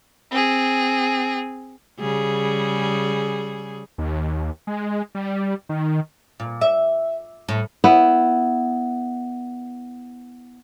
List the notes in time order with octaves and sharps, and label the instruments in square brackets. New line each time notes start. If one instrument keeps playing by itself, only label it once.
[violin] C4 G#4
[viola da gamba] C#3 G3 G#4
[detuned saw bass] D#2
G#3
G3
D#3
[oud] A#2
E5
A2
[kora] B3 E4